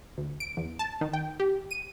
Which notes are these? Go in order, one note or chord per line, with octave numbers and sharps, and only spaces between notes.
D2
D7
E2
A5
D#3
G5
G4
D#7